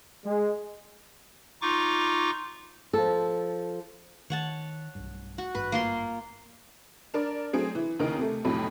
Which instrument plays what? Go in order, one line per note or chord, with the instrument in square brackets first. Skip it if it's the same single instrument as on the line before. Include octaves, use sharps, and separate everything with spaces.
[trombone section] G#3
[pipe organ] D#4 F4 C#6 D6
[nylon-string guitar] F3 A4
[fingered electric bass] D#3 [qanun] C#5 F#5 A5
[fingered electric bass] B1 G2
[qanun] F#4
[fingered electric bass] G#1 G2 [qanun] B4
[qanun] A#3 F4 C6
[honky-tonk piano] D4 A#4 D5
F#3 A3 C4 G#4
E3
D#2 C#3 E3 D#4 A#4
C3 A3
B1 F2 A2 C3 F#3